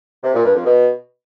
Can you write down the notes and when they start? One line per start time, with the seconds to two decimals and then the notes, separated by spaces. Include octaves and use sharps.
0.23 C3
0.34 A#2
0.44 G2
0.55 F2
0.65 B2